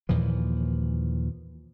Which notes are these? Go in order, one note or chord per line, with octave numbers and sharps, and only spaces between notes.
D#2 A#2 E3 F3